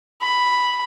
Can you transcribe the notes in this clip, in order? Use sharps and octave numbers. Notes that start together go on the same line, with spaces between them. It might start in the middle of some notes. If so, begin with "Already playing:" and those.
B5